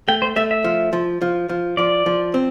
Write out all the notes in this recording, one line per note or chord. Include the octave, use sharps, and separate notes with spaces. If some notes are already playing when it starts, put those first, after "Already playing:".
A3 G5
C5
A3 E5
E5
F3
F3
F3
F3
F3 D5
F3
C4